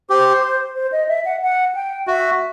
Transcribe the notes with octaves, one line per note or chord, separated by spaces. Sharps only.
G4 C5
C5
D#5
E5
F#5
F#5
G5
F#4 E5